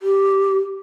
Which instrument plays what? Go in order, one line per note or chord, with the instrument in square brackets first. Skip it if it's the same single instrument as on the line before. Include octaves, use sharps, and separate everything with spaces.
[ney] G4